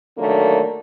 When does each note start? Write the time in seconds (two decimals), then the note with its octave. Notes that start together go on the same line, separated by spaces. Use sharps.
0.17 D3 D#3 F#3 A3 A#3